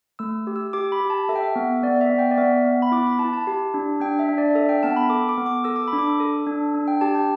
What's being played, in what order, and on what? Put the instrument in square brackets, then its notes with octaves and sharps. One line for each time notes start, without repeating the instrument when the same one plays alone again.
[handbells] A3 E6
G4
E6
G4 D6
B5
G4
A5
A4 E5
G5
E5
B3
B3 D5
E5
B3
G5
D5
B3 E5
B3
B5
E4 D6
B5
E4 A5
A5
G4
D4
D4 G5
E5
D4
D5
A4 E5
G5
B3 A5
B5
A4 D6
D6
B3
D6
A4 E6
D6
B5
D4
D6
A4
D4
D4
G5
G4 A5
G5